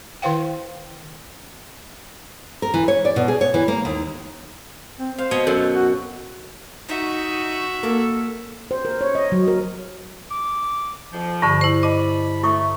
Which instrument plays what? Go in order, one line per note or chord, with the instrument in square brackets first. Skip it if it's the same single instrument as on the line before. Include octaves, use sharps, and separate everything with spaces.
[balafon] D#3 E4 C5 F5 G5
[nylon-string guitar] A#4
E3
C#5
D5
B2
G#4
C#5
E3
A#3
D#2
[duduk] C4
[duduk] C5 [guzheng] F5
[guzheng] B2 C#5 D#5
[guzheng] F#2 F#5 [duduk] A4
[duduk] F#4
[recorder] D#4 [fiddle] F#4 E5
[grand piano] A#3 [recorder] A4
[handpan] C5
A#4
C#5
D#5
F#3
A#4
[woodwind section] D6
F2 F3
[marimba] G2 D3 [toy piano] A5 C#6
[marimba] E4 C5
[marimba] D#5 [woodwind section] A5 B5 [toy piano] D6
[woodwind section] A3 [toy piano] E4 C#6 D#6